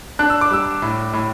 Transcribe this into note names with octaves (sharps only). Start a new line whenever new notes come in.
D4 F#6
E6
D6
G3 E6
A2
A2